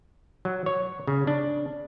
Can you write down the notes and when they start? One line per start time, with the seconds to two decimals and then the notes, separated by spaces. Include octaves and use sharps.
0.45 F#3
0.66 C#5
1.07 C#3
1.27 D4